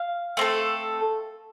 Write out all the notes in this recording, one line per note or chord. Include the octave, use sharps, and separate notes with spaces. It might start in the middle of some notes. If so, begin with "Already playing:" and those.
Already playing: F5
A3 C4 A4